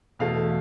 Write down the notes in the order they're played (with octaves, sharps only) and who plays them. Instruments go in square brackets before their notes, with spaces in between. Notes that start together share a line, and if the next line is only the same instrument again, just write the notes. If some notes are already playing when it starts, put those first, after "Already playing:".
[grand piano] E2 B2 A3 F5